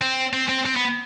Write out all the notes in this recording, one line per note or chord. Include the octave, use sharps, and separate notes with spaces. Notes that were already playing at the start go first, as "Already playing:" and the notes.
C4
C4
C4
C4
B3